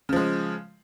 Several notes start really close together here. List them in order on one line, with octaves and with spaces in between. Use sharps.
C#3 F3 G#3